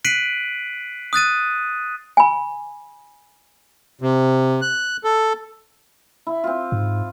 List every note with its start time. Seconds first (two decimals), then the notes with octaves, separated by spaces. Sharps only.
0.05 F#6 B6 C7 D7 D#7 F#7
1.13 D#6 F#6 A6 D#7
2.17 G#5 B5
4.01 C3
4.62 F#6
5.04 A4
6.27 E4
6.44 C4 F4
6.72 G#2